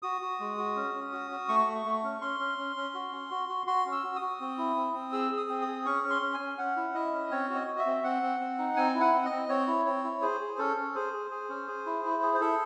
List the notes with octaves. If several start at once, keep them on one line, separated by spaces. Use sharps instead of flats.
F#4 D#6
F#4
G#3
F#4
C#4
C#4
F#4
F#4
A3 C#6
A3
A3
C#4
C#4 C6
C#4
C#4
C#4
F#4
C#4
F#4
F#4
F#4 C6
C#4
E6
F#4
D#6
F#4
C4
E4
C4
C4
G#4 E6
G#4
D#6
C4
D#6
G#4
C#4 C#6
C#4
C6
C#4
G#5
C#4
C#4 F#5
E4
E4 D#5
C#4
C4 C#5
F#4
D#5
F#4
E5
C4
C4 F#5
C4
C4
D#4
C4 G#5
E4
F#5
C4
D#5
C4
C4 C#5
E4
C4 C#5
E4
G#4 C5
G#4
C#4 A4
C#4
G#4 C5
G#4
G#4
C#4
G#4
E4
E4
G#4
C5
E4 A4